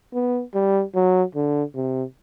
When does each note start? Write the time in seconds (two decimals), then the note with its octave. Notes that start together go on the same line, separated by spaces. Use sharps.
0.14 B3
0.55 G3
0.95 F#3
1.35 D3
1.75 C3